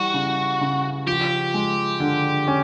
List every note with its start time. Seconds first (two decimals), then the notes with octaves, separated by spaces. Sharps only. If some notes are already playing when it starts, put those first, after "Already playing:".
Already playing: E3 G3 F#4
0.14 C#3
0.61 C#3
1.07 F3 G4
1.54 G#3
2.00 D3
2.48 C#4